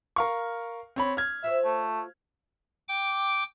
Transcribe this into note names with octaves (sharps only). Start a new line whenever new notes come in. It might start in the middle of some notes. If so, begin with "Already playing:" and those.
A#4 F5 C#6
C4 C#5 B5
D4 F6 G#6
F4 C5 C#5 E5
A3
G5 D6